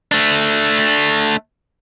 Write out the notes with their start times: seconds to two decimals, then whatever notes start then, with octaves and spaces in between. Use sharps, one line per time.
0.12 A3 D4